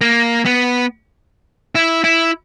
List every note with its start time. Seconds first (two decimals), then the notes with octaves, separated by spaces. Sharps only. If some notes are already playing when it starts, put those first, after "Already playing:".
0.01 A#3
0.45 B3
1.75 E4
2.04 E4